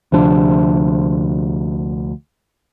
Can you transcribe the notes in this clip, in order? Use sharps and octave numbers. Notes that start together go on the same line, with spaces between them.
D2 C3 F3 D4